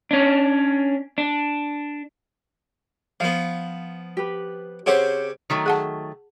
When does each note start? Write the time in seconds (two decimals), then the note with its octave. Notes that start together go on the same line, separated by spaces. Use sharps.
0.11 C#4 D4
1.18 D4
3.20 F3 B3 F5
4.17 G4 B4
4.86 C#3 C4 G4 C5 C#5 F#5
5.50 D#3 F#3 A3
5.66 G#4 F#5 A5